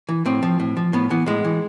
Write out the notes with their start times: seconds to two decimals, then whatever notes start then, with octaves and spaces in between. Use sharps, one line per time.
0.09 E3
0.25 A2 C4
0.43 F3
0.60 A2
0.77 F3
0.93 A2 B3
1.10 E3 B3
1.26 A2 G#3
1.45 E3